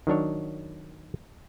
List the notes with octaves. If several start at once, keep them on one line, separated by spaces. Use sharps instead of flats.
D#3 F#3 D4 C#5